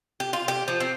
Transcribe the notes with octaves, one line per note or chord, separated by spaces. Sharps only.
G4
F4
G4
F3
C4